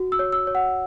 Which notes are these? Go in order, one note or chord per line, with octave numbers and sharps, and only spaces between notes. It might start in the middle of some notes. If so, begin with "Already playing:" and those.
Already playing: F#4
E6
C#5
E6
C#5
F#5